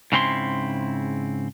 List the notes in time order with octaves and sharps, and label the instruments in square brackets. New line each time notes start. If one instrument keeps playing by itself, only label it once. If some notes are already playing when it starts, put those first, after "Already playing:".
[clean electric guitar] G#2 C#3 C4 E4 C6